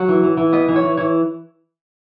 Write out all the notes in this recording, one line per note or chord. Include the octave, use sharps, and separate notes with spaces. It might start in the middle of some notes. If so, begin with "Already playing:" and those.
Already playing: F#3 F#5
E3
E3
E3
B3 D#5
E3
C#5
E3
E3 C#5